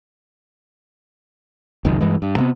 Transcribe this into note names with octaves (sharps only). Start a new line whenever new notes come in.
F1 C#2 F#2 D#3
G2 E3 G#3
G2
C3 A3 B3